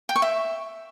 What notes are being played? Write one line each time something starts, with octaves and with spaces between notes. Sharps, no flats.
G5
C#6
E5